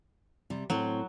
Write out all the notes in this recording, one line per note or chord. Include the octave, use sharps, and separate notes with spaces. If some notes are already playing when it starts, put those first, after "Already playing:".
C3 G3
A2 F#3 C4